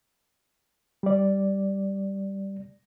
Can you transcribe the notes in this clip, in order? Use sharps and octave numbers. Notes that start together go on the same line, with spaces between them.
G3 D5